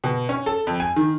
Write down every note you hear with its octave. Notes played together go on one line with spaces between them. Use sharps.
B2
C#4
A4
F2
G#5
D#3